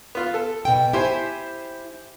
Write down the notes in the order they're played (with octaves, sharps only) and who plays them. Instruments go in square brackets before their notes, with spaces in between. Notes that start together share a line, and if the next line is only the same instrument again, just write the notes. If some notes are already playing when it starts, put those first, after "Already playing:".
[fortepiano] B3 F4
A4
[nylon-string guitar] B2 G5
[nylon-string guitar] E4 [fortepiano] G4 C5 G#5